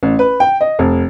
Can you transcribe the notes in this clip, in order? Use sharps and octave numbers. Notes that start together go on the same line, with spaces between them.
A1
B4
G5
D#5
F1